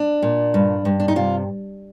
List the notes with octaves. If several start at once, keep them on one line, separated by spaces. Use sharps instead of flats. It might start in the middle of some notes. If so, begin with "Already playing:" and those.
Already playing: D4
A#2
G2
G2
D4
D#4
C3 F4